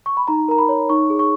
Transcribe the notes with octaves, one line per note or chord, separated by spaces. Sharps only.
C#6
B5
D#4 A#5
A#4 A#5
B5
C#5
D#4 C#6
G#4
C#6